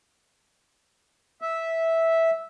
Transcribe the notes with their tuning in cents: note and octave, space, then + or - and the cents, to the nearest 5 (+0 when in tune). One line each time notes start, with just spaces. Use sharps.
E5 -10